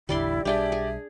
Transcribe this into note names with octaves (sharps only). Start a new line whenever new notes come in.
A1 E2 D3 G3 E4 D5 C6
B1 G3 D4 G4 G#4 D5 E5 G5
G#4